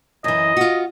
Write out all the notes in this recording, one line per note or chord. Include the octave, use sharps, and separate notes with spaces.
F#2 E3 D#5
F4 F#4